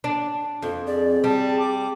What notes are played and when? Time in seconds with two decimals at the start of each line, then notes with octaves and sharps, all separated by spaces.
0.04 D4
0.63 F2 A4
0.87 G#4 D5
1.24 G3 A5
1.59 D6